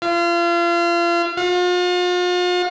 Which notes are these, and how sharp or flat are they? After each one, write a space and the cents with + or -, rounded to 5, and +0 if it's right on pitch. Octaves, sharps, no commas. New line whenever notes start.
F4 -35
F4 +40